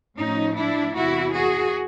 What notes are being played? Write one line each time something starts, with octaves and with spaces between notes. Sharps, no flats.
A2 F3 C#4 D#4
D4 E4
E2 C3 E3 E4 F#4
F#4 G#4